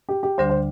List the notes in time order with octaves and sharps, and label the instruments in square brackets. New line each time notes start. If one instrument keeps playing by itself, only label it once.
[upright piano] G4
G4
[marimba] D2 D3 G3 D4 [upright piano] C5
[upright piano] C5